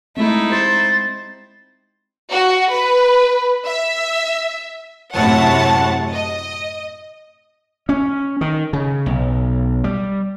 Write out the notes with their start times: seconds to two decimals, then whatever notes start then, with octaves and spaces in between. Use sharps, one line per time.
0.17 G#3 A3 C4 D#4 E4
0.52 G4 C5 A6
2.31 F#4
2.70 B4
3.66 E5
5.14 F#2 A2 C3 C#5 F#5 A5
6.14 D#5
7.89 C#4
8.41 D#3
8.73 C#3
9.06 B1
9.84 G3